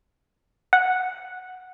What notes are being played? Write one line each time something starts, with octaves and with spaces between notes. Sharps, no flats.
F#5